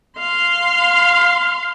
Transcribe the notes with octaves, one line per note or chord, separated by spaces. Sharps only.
F5 C6